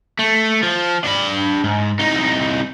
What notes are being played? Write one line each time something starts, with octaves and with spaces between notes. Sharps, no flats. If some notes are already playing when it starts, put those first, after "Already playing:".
A3
F3
D4 B5
G#2
C2 D#4